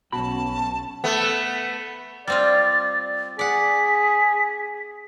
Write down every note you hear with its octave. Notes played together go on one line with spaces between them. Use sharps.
B1 B2 F#3 C#4 F#4 A5 B5
A3 B3
G3 C4 F4 D5 A6
G#4 D5 F#5 B6